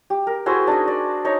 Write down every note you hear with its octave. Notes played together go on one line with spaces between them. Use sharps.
G4
A#4
E4 F#4 G#4 C5
D4 D#4 D#5
D5
D#4 C#5